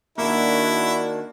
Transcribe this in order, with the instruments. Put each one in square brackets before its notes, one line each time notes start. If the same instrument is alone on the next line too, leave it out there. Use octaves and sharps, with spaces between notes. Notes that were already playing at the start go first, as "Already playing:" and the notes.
[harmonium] D#3 D4 F#4 [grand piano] A#3 [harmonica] E4